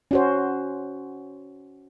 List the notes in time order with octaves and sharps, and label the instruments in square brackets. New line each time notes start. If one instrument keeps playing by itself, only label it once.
[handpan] C#4 F#4 C5